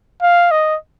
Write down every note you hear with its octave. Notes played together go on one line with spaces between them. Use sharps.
F5
D#5